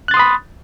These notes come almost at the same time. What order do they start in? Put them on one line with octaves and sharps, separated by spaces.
F#6 A6 C6 D#6 B5